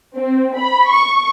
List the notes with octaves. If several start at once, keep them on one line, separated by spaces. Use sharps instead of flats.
C4
B5
C#6